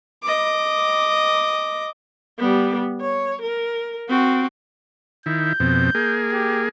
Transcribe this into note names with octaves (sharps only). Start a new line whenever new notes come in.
D#5 D6
G3 B3
C#5
A#4
C4 F#4
D#3 E4 G6
F2 B2 C4
A#3 G#4
G4